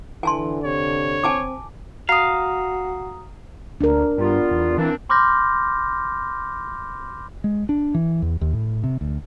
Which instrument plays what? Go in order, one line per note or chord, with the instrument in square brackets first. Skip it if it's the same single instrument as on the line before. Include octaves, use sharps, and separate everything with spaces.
[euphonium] D3 [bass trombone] E3 [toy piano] G#5 A5 C6
[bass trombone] C3 [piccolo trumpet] C#5
[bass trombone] C4 [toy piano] G#5 A5 D6
[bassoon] F#4 [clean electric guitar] F5 [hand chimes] A#5 D#6
[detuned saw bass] D2 [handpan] D4 A#4
[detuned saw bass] G2 [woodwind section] G3 B3 F4
[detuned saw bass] E2
[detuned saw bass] E3 [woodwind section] A#3 C4 D4
[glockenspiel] B5 C6 D6 F6 G6 A#6
[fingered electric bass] G#3
D4
E3
E2
D#2
A2
C3
D2